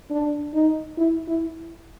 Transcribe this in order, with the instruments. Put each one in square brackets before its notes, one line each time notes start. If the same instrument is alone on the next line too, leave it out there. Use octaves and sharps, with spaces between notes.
[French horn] D4
D#4
E4
E4